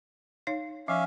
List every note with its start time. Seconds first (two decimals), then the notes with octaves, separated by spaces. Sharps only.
0.47 D#4 C#5 F5
0.88 F3 C#4 E5 F5